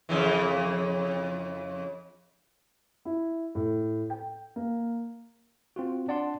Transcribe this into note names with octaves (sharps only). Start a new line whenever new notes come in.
F2 C#3 E3
E4
A2
G5
A#3
C4 F4 F#4
D4 D5 F#5 A5 C6